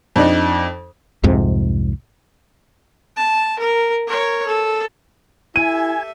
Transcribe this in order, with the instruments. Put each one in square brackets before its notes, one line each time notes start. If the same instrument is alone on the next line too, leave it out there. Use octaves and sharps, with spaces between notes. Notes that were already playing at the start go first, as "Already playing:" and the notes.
[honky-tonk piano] F2 D4 D#4
[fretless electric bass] C2 F2 G#2 C3
[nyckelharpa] A5
A#4
A#4 C#5
A4
[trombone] E4 [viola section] G4 A4 E5 [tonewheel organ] G#5 [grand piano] D#7